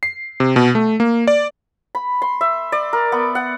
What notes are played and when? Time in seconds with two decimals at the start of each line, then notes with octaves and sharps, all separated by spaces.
0.03 C7
0.40 C3
0.56 B2
0.75 A3
1.00 A#3
1.28 D5
1.95 B5
2.22 C6
2.41 E5
2.72 D5
2.93 A#4
3.12 B3
3.35 F#5